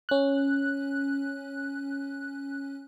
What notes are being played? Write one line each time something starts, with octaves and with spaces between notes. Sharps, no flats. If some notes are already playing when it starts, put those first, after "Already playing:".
C#4 F#6